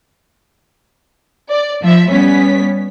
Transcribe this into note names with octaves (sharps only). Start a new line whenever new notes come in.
D5
F3 E5
G3 B3 C#4 B6